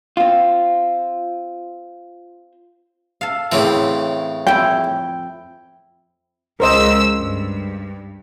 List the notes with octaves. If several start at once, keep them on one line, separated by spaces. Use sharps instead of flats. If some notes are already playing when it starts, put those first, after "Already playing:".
C4 F4
A4 F5
A2 C#3 E3 C4 G4
F2 E4 G5
C#2 A#4 C5 D#5 E6
G2